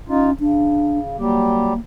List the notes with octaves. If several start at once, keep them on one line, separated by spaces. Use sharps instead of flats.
C#4 D#4 F4
C#3 D4
F#3 G3 A#3 G4